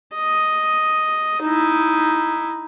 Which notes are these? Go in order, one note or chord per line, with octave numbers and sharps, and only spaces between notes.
D#5
D#4 E4